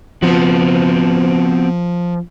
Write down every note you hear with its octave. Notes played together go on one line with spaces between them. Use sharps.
F3 B3 C4 F#4